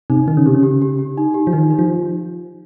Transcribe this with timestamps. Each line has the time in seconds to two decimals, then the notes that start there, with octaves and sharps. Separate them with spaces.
0.10 C3 D#4
0.28 D#3 D#4
0.37 C#3
0.46 C3 G4
0.54 C#3
0.63 G4
0.82 G4
0.99 G4
1.18 D#4
1.34 G4
1.47 F3
1.53 D#3 D#4
1.70 D#4
1.79 F3